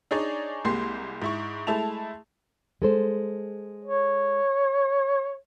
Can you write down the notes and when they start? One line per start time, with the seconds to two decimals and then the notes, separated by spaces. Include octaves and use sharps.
0.11 D4 D#4 G#4 C#5 D5
0.65 C2 G#3 A#3 G4 C6 C7
1.22 G#2 E4 C#6
1.67 G#3 A3 E4 A5 F7
2.82 G#3 A4 C5
3.84 C#5